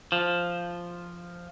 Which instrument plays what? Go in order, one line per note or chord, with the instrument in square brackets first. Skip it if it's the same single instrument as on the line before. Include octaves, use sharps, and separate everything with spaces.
[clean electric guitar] F3